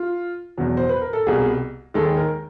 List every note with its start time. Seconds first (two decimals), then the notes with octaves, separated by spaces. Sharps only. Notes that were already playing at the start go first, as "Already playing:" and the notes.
Already playing: F4
0.57 E2 B2 F#3
0.77 C5
0.89 B4
1.01 A#4
1.13 A4
1.27 C2 B2 G3 G#4
1.94 D#2 D#3 G#3 A4
2.17 A#4